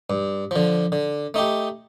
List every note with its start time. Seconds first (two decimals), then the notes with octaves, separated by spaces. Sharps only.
0.10 G2
0.51 D3 F3
0.92 D3
1.34 A3 D#4 G4